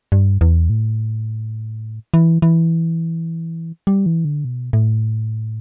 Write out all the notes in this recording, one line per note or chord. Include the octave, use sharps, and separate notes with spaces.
G2
E2
A2
E3
E3
G3
E3
D3
B2
A2